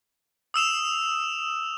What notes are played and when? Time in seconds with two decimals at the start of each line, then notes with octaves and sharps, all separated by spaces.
0.54 D#6 E6 E7 F7